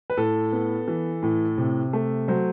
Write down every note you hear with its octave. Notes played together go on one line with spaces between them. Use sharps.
B4
A2 A4
B3
E3
A2
C3
A3
F#3 C5